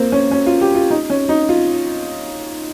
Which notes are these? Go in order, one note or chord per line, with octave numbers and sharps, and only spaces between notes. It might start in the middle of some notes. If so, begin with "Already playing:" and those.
Already playing: A#3 C4
C#4
C#4
F4
G4
F4
D#4
C#4
D#4
F4